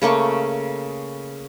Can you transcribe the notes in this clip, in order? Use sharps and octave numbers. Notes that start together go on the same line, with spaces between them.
C#3 A3 A#3 C#6